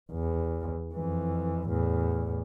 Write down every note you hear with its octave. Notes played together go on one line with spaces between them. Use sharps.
E2
F2 E3
E2 A2